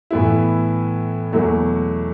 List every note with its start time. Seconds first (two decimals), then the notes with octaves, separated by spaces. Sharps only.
0.11 A2 E3 B3 E4
1.32 E2 B2 F#3 A3 E4